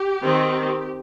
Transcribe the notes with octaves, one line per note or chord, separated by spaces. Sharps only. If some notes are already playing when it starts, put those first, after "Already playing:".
Already playing: G4
D#3 C4